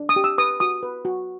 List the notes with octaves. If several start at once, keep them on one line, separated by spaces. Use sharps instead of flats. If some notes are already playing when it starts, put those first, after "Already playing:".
Already playing: D4
D#6
G4
E6
B4 D#6
F#4 D#6
B4
F#4